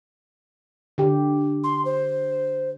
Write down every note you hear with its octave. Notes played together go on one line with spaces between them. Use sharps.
D3 G4
C6
C5